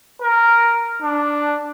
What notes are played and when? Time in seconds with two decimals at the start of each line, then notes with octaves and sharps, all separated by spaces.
0.22 A#4
1.02 D4